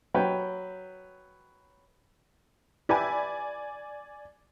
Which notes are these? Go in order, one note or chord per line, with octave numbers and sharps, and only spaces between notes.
F#3 B4 G5
E4 G4 B4 D5 G#5